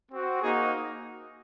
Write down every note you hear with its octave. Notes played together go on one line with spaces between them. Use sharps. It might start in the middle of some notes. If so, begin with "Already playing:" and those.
C4 F#4
A#3 D#4 F#4 G#4